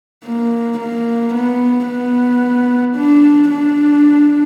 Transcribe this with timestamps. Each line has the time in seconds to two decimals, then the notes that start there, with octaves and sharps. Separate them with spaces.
0.25 A#3
0.79 A#3
1.34 B3
1.87 B3
2.96 D4
3.50 D4